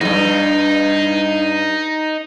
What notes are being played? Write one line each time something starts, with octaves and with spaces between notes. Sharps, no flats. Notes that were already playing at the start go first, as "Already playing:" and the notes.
E2 G2 D#4